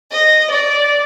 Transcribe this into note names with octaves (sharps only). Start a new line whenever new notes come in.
D#5
D5